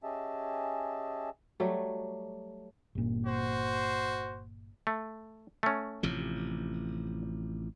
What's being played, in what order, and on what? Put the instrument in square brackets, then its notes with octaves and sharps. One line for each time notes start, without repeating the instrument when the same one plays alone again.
[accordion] C#4 G4 G#4 D#5 E5 A5
[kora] F#3 G3 A3
[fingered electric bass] G1 A#2
[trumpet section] F#4 C5
[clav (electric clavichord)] A3
A3 C#4
[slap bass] A1 C3 F3